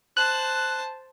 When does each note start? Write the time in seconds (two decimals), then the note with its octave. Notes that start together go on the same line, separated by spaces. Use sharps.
0.17 C5 A5 F#6